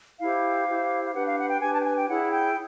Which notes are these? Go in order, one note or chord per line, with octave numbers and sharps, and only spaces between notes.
E4 G4 C5 F5
E4 G4 C5
F5
D4 G4 B4 F#5
F5
F#5
G5
D4 G4 B4 G#5
A5
G5
G#5
G5
E4 G#4 C#5 F#5
G5